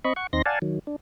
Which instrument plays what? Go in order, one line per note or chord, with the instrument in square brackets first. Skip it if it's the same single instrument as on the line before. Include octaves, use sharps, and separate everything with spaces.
[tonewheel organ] C4 D#5 B5 C#6
F#5 C#6
D#2 C4 D#4 C6 A#6
D5 F5 F#5 G#5 A5
D#3 F#3
D4